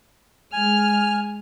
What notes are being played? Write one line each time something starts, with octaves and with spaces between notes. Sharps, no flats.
G#3 G#5 F6